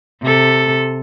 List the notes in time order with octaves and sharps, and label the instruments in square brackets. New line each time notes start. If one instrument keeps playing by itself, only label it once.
[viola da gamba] C3 A4